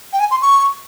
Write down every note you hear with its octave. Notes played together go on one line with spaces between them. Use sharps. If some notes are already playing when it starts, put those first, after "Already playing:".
G5
G#5
C6
C#6